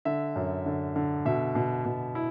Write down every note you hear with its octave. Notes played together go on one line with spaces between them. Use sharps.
D3 E5
F#2
D3
D3
B2 E5
B2
B2
E4